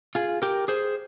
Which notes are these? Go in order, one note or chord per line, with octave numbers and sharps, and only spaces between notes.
F4 G#4
G4 A#4
G#4 C5